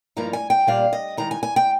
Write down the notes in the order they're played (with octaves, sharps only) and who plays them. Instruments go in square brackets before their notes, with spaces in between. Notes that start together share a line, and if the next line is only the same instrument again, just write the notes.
[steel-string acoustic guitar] G2 F3 A#3 D#4 A#5
G#5
G5
A#2 G3 A#3 D4 F5
D#5
D#3 G#3 D#4 A#5
G#5
G#5
G5